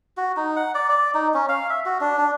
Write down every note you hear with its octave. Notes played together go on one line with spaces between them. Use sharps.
F#4
D#4
F#5
D5
D5
D#4
C#4
F5
E5
F#4
D4
D4